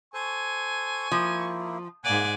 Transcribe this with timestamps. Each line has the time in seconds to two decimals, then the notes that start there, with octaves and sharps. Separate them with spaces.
0.14 A4 C5 G#5 C#6
1.12 F3 A#3 E4
2.04 G#2 A#3 D5 F#5 G#5